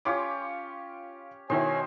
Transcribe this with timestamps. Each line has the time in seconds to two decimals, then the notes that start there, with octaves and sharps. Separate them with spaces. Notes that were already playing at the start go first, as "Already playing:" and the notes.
0.05 C#4 F4 G4 C#5 C6 D6
1.50 B2 D#3 E4 C5 C#5 G#5